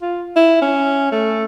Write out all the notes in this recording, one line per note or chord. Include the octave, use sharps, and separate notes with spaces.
F4
E4
C#4
A3